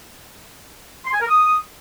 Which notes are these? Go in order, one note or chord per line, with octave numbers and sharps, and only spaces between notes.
C6
G#5
A#4
D#6